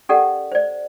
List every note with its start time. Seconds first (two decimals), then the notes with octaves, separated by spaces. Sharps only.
0.09 C#4 G4 A4 A#4 D5 F#5
0.52 C5 D5